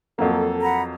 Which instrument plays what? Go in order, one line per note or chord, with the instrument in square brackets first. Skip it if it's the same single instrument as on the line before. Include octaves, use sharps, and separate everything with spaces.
[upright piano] F2 F#3 A#3 [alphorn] A4
[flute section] F#5 A#5 B5